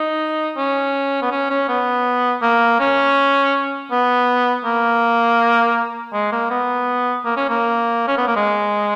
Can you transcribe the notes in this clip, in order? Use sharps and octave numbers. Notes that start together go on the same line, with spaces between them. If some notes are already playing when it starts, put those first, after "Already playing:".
Already playing: D#4
C#4
B3
C#4
C#4
B3
A#3
C#4
B3
A#3
G#3
A#3
B3
A#3
C#4
A#3
C#4
B3
A#3
G#3